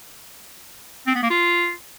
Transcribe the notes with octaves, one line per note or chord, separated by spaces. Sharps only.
C4
B3
A#3
F4